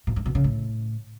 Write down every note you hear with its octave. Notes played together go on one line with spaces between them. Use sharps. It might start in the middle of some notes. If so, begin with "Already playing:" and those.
A#2
G#2
B2
C#3
A2